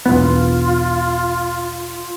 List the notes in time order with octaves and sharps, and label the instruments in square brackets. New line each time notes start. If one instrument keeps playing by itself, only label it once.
[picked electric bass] E1 B1 B3 [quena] F4